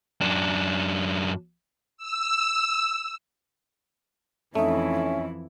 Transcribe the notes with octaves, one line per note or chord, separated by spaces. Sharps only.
F#2 D4
E6
F2 E3 A3 C#4 D#4 E4 E5